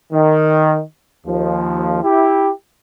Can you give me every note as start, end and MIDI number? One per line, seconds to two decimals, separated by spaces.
0.12 0.81 51
1.26 1.98 39
1.26 1.98 53
2.02 2.50 64
2.02 2.50 67